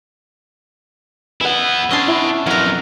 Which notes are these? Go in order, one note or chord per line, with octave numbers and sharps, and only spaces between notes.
B3 E4 F#5 E6
C#4 D4 D#5 A5 C6 E6
E4
F2 F#3 B3 A#4 F5